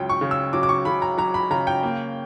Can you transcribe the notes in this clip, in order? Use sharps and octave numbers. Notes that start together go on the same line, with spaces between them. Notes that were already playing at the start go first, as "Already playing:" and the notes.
Already playing: C#2 C#3 F#3 G5
C#6
C#3
E6
F#3 D6
D6
C#6
C#3 B5
A#5
F#3 A#5
B5
C#3 A#5
G5
A#3